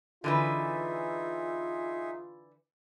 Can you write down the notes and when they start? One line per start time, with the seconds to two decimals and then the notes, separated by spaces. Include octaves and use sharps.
0.24 D3 E3 D#4 F4 G#4 B4 E5